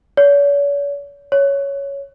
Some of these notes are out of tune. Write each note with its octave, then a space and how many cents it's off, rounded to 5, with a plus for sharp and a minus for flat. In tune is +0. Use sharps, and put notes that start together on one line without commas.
C#5 +45
C#5 +5